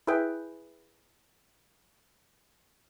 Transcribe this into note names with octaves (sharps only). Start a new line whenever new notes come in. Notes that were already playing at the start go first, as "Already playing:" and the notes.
E4 G#4 B4 G5